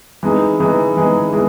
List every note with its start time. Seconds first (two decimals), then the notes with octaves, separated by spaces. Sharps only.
0.23 E3 G#3 D#4 G#4
0.60 E3 G#3 D#4 G#4
0.97 E3 G#3 D#4 G#4
1.33 E3 G#3 G#4